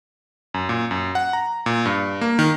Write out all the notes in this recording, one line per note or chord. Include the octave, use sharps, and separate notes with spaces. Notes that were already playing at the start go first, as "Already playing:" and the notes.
F#2
A#2
F#2
F#5
A#5
A#2
G2
A#3
D#3